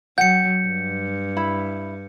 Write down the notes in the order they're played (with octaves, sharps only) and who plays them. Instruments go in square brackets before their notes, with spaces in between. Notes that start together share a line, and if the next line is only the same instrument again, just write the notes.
[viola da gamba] F#3 [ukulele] F#5 G5 [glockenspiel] G6 C#7
[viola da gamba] G2
[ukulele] E4 B5